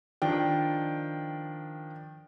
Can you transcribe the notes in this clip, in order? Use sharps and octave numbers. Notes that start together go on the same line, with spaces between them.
D#3 F3 D4 G5